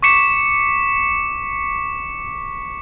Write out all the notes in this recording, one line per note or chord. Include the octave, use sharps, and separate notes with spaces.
C#6 D6 B6 C#7 E7